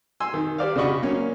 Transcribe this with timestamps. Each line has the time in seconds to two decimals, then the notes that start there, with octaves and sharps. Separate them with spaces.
0.20 G#5 C6 E6
0.34 D#3
0.58 G4 C5 D5 F5
0.76 C#3 D4 F#4 D#5 B5 C#6
1.02 F#3 A#3 C#4